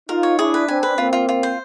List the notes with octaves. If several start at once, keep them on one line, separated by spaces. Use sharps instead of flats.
D#4 F4 A#4
C#5
D4 E4 G#4
B4
C4 D4 G#5
B4
A#3 C4 F4
F4
F4
C5